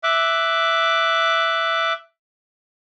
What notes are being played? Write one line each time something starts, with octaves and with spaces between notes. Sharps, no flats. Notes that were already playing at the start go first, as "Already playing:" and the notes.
E5 D6 F#6